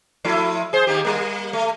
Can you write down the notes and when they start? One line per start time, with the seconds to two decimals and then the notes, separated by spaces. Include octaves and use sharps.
0.25 F3 A3 E4
0.73 G#4 C5
0.87 D#3 A#3 G4
1.05 G3 A#3
1.53 A3